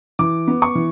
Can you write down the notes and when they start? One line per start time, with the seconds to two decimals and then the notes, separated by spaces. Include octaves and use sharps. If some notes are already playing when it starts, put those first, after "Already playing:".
0.19 E3 D6
0.48 B3
0.62 C#6
0.75 E3